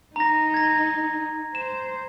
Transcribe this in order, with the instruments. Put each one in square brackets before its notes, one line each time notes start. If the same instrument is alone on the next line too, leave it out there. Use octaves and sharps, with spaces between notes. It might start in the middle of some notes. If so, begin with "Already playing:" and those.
[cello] D#4 [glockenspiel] A#5 A#6
[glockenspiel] G#6 A#6
[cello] C5 [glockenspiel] E7